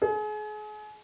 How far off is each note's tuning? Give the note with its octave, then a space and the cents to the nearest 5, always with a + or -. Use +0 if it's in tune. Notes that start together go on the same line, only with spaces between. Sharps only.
G#4 +35